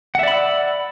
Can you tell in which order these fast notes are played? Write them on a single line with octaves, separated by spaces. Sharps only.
F#5 E5 D5 B5 E6